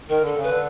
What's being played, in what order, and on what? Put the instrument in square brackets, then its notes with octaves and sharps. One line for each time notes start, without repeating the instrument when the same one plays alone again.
[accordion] D#3 [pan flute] A#4
[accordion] D3 [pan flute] A4
[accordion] C#3
[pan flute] B4
[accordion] D3